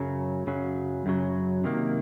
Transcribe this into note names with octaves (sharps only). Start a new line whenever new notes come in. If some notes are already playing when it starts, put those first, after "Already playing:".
Already playing: F#2 C#3 F#3
F#2 C#3 F#3
F#2 C#3 F#3
C3 D#3 A#3